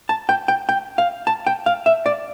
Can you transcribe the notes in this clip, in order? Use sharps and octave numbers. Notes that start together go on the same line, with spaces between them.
A5
G5
G5
G5
F5
A5
G5
F5
E5
D5